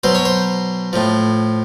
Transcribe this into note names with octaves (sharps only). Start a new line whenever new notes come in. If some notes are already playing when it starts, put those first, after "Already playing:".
B2 F#3 C5
C#5
C5
A2 F3